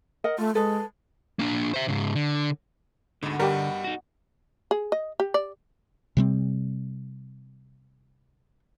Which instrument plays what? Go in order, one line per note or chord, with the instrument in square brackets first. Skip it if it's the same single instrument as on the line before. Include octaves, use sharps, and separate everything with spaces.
[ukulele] A#4 D#5 F#5
[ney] A3 [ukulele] F4
[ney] G#3 [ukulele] A4 B4
[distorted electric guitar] A#3 D4
C5 E5
G#2 C#3
D3
[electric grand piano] D2 G#2 [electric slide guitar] D3 [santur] B3 D#4 F#4
[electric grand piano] G2 G3 [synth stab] G4 A#4
[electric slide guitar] D#4 F#4
[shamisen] G#4
D#5
G4
D5
[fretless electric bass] C3 G3 C4